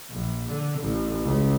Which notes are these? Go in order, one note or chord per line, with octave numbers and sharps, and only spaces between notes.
A#1
D3
A1
C#2